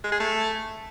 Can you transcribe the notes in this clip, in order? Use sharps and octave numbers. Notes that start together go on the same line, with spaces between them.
G#3
G#4
A3